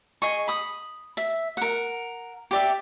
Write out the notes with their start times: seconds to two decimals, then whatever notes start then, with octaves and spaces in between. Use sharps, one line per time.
0.22 G#4 D#5 C#6
0.48 B5 D#6
1.17 E5
1.57 A#4 F#5
2.51 G4 D5 E5